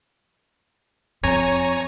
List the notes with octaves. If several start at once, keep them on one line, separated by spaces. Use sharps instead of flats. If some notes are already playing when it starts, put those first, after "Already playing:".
F2 C#5 G#5 A#5